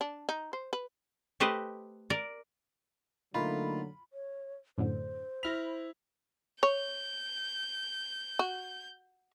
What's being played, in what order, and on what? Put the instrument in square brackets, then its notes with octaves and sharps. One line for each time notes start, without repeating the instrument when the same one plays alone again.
[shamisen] D4
D#4
C5
B4
[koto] A3 G4 B4 C5 D#5
A#4 D5
[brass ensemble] D3 F#3 [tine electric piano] A3 A#3 D#4 [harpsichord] F4 [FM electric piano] B5
[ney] C#5
[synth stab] F#2 A2 D3 [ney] C5
[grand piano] E4 F7 [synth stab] B5 F6 A#6
[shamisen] C#5 [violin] G6
[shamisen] F#4